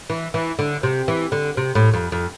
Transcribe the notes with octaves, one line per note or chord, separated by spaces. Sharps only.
E3
E3
D3
C3
E3
D3
C3
A2
F2
F2